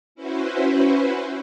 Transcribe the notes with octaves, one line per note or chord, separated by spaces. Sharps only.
C#4 E4 F#4 B4 C5